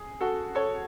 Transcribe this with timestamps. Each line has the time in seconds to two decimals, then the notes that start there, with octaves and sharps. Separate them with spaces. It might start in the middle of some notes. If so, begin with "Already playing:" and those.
Already playing: G#4
0.21 F#4 A4
0.55 A4 C#5